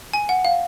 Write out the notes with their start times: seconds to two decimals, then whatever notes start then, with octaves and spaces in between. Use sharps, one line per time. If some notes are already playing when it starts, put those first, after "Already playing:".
0.13 G#5
0.29 F#5
0.45 F5